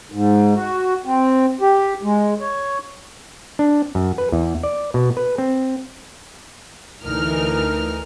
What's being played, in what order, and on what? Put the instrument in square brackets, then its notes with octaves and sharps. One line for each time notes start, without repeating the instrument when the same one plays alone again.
[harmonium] G#2
F#4
C4
G4
G#3
C#5
[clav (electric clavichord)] D4
F#2
B4
E2
D5
B2
B4
C4
[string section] D2 E3 D#4 A#4 F6